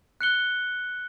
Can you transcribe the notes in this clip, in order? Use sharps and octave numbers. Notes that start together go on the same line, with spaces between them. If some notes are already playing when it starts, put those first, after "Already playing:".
F#6 C#7 G7